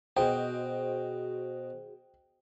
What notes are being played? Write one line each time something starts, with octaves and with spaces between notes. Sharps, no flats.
B2 F#4 G#4 C5 D#5 G5